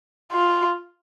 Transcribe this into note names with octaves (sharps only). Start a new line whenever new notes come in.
F4